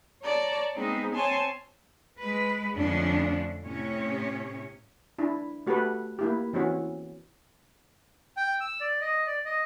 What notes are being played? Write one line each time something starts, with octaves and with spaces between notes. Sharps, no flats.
C#5 D5 A5 A#5
G#3 B3 C4 D#4
C4 C#5 G#5 A5 C6
G#3 B4
F2 D3 F3 A3 C#4 D4
A2 C3 C#4 C#5
D4 E4
A3 F#4 G4 A4 B4
A#3 E4 G4
E3 C4 C#4 F#4
G5
E6
D5
D#5
D5
D#5